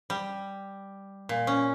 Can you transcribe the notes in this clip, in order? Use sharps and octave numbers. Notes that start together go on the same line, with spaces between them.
G3
A#2
C#4